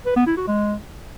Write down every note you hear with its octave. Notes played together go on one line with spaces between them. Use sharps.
B4
B3
E4
F#4
G#3